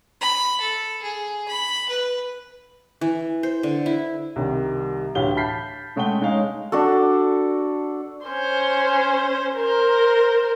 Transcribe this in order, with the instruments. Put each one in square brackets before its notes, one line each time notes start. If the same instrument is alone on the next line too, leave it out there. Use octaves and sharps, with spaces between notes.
[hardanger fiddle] B5
A4
G#4
B5
B4
[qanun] E3
C5
D3
E4
[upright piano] C2 D#3 G3
D2 A2 E3 G4 F5 G7
A5 B5 F6 G6 B6 C7
C#3 G#3 A3 F#5 G5 G7
G#3 D#4 C#5 F5
[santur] D4 F#4 A4
[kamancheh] C#4 C5
A#4 C5